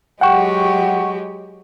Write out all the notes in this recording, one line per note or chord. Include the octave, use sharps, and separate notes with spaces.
F#3 G#3 G4 F#5 G5 C#6